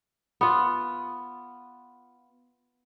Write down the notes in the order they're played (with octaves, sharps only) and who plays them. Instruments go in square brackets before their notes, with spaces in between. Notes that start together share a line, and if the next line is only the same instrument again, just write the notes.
[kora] B3 F4